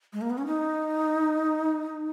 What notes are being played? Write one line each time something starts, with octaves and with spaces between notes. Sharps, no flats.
G#3
A#3
B3
C#4
D#4